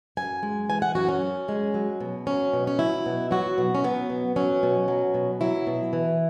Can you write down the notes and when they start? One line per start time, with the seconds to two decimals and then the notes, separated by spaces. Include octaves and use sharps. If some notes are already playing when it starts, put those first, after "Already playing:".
0.17 F#2 G#5
0.43 G#3
0.70 E3 G#5
0.82 F#5
0.95 F#2 F#4
1.08 C#4
1.22 F#2
1.49 G#3
1.74 F#3
2.00 B2
2.27 F#3 C#4
2.53 B2
2.67 C#4
2.79 F#3 E4
3.06 B2
3.31 F#3 F#4
3.58 B2
3.75 C#4
3.84 F#3 B3
4.10 B2
4.36 F#3 C#4
4.63 B2
4.88 F#3
5.14 B2
5.41 F#3 E4
5.67 B2
5.93 E3